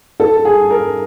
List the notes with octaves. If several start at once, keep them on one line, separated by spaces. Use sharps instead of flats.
A4
G#4
A#4